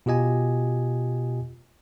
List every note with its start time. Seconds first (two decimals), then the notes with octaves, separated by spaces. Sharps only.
0.06 B2 F4 G4 D#5 G#5